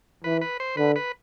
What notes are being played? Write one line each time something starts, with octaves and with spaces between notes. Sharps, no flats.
E3 B4
B4
C5
D3 B4
B4